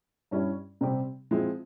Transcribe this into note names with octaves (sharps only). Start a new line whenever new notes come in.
G2 G3 C#4 E4
C3 G3 C4 G4
F3 G#3 C4 E4